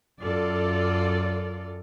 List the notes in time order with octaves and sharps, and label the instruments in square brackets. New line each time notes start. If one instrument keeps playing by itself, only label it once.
[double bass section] F#2 [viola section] F4 A4 D5